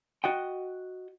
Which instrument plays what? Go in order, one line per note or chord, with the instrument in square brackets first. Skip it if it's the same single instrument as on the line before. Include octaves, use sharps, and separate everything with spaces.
[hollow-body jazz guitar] F#4 D#5 G5